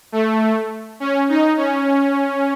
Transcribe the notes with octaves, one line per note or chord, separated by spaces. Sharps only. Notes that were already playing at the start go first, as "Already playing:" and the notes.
A3
C#4
D#4
C#4